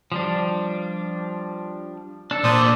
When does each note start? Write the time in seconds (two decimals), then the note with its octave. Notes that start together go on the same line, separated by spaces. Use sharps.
0.12 F3 G3 D4
2.31 D4 A4
2.44 A#2 C5 D5 D#6